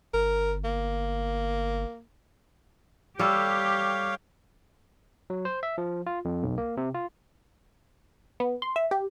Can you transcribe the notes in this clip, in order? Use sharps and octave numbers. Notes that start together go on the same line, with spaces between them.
G1 A#4
A#3
G3 G4 A4 C#5 F5
F#3
C5
E5
F3
F4
F2
B1
A#3
C3
F4
B3
C6
E5
G4